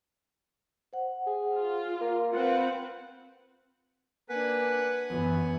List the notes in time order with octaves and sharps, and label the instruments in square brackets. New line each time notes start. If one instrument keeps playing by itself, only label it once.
[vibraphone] C5 F#5
[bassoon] G#4
[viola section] F4
[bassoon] A#3 [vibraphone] A#4
[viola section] C4 B4 F#5 [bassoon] F4
[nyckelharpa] A#3 D4 [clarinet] B4 [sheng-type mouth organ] F#5 G#5
[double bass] F#2 E3 [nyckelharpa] B3